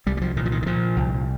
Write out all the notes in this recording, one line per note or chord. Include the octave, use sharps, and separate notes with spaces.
C2 G3
G3
F3
A#2 D#3
F3
D#3
D#3
A#2 F3
C2